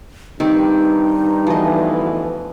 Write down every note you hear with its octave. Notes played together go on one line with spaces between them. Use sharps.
G2 D#3 C4 D#4 G4
D2 B2 E3 F3 D#5